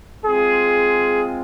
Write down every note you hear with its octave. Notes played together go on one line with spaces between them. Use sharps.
G#3 C4 F4 G#4